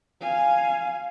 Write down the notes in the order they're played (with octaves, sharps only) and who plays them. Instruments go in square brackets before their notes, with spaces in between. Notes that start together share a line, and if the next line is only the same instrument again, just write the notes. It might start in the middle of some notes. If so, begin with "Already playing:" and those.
[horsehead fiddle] F5 G#5